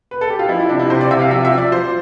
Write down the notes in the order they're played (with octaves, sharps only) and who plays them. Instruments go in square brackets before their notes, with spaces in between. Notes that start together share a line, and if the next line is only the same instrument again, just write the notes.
[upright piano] B4
A4
G4
F4
F3 E4
E4
C3 D4
E4
C3 C5
D5
C3 E5
F5
F3 E5
E5
F3
D5
F3 C5